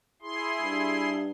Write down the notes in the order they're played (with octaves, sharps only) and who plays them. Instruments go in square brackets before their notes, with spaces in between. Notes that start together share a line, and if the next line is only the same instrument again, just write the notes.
[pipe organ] E4 G#4 C6
[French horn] G2